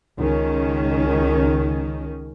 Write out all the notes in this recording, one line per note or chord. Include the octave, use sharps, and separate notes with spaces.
C#2 D#3 C#4